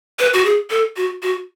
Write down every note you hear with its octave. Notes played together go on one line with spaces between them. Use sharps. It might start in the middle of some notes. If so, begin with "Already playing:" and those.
B4
F#4
G#4
A4
F#4
F#4